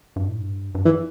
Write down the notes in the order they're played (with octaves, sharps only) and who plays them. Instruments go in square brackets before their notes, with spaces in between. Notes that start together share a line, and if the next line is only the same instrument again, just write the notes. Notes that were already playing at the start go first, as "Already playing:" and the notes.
[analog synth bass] G2
A2
G2
G2
[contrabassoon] E3